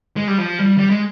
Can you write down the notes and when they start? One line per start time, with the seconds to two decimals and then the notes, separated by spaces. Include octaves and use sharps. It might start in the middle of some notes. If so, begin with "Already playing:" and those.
0.16 G#3
0.28 G3
0.38 F3
0.59 G3
0.78 G3
0.90 G#3